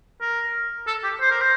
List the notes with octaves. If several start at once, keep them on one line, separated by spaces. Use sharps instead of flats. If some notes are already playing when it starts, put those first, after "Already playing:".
A#4
A4
G4
C5
A#4
C5